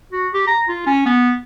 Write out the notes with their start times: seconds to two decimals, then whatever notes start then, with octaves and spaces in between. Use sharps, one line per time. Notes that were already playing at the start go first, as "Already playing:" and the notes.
0.12 F#4
0.34 G4
0.47 A#5
0.69 F4
0.86 C#4
1.06 B3